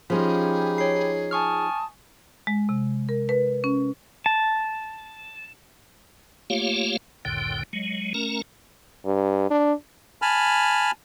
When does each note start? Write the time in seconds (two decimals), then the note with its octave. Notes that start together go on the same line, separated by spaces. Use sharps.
0.10 F3 C#4 D#4 F4 G4 G#4 B5
0.78 C#5 C7
1.31 G#5 A5 C#6 D#6 F6
2.47 G#3
2.69 C3
3.09 A#4
3.29 B4
3.64 C#4
4.26 A5
6.50 A3 A#3 F4 G4 C#5 F5
7.25 F#1 C2 F2 A2 D3 G5
7.73 F#3 G#3
8.14 A3 C#4 A#4 A#5
9.05 G2
9.50 D4
10.22 G#5 A5 B5 F6